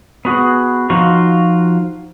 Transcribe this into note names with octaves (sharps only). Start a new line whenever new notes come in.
B3 F#4 G#4
F3 D#4 F4 F#4